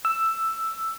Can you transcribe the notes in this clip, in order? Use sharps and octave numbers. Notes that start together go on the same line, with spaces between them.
E6